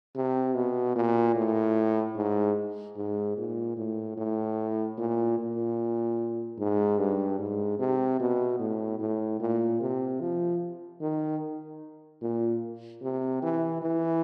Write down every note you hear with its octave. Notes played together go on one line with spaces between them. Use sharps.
C3
B2
A#2
A2
G#2
G#2
A#2
A2
A2
A#2
A#2
G#2
G2
G#2
C3
B2
A2
A2
A#2
C3
F3
D#3
A#2
C3
E3
E3